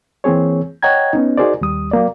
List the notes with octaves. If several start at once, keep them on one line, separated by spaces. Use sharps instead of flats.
E3 A#3 C4 G#4 C#5
C#5 D#5 F#5 G5 A#5 G#6
B3 C#4 D#4
D#4 F#4 G#4 A#4 C5 D5
D#2 G3 D#6
F#3 A#3 D5